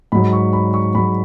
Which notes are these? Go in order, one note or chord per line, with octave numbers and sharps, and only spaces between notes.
G#2 F#3 B5
C#6
B5
C#6
G#2 F#3 B5